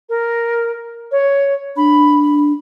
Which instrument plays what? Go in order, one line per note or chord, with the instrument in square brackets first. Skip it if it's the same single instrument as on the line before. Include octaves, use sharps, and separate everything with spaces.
[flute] A#4
C#5
[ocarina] D4 [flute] B5